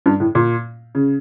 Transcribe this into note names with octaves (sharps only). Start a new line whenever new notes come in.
G2
A2
A#2
C#3